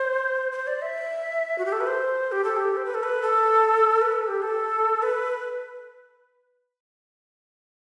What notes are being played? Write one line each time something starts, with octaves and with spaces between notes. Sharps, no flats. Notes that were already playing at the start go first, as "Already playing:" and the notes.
Already playing: C5
C5
D5
E5
F#4
G4
A4
B4
C5
G4
A4
G4
C5
B4
A4
B4
A4
B4
A4
G4
A4
B4